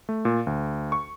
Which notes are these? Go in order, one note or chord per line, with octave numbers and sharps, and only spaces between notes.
A3
A#2
D2
C#6